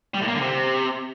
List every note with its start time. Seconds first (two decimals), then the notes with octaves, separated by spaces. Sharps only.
0.14 G3
0.21 A2
0.28 A#3
0.35 D3
0.41 C3